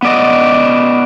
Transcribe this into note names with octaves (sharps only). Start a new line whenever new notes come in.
B3 D5 D#5